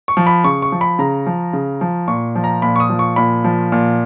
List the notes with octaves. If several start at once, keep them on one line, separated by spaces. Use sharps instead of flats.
C#6
F3
B5
C#3 C#6
C#6
F3
B5
C#3 A#5
F3
C#3
F3
A#2 C#6
F3
A#5
A#2 B5
C#6
D#6
F3
C#6
A#2 B5
F3
A#2